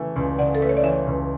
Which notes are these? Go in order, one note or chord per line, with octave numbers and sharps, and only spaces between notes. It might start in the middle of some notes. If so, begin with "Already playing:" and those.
Already playing: C#3 E3 A3
C#2
C#3 D5 F#5
A4
A3 B4
C#5
D5
E3 C#5 E5
C#2